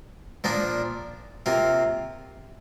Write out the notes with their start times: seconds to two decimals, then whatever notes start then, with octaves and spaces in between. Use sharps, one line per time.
0.44 A#2 F3 A#3 D4
1.46 C3 A#3 F4